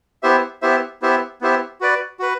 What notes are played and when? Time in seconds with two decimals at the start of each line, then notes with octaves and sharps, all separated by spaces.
0.23 B3 E4 G4 C5 E5
0.62 B3 E4 G4 C5 E5
1.02 B3 E4 G4 C5 E5
1.41 B3 E4 G4 C5 E5
1.81 F#4 B4 D5
2.19 F#4 B4